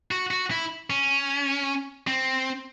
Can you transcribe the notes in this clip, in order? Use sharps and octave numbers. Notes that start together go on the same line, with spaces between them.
F#4
F#4
E4
C#4
C4